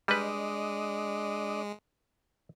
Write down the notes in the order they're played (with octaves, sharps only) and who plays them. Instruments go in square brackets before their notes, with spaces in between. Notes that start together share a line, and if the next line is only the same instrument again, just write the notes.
[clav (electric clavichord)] G3 B4 [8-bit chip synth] G#3 [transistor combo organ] D4 D5 D#5